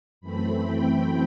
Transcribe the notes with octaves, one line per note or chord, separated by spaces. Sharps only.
F#2 E3 A3 C4 B5
G5